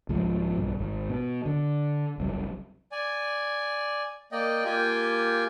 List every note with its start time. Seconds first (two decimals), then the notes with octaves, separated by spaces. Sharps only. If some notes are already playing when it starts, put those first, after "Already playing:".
0.09 C2 G#2 F3 G#3
0.56 B1 G2
0.79 G#1 G#2
1.09 B2
1.46 D3
2.18 F#1 C2 F#2
2.92 D5 G#5
4.32 A#3 D5 D#5 G5
4.65 A#3 F4 G4 G5 G#5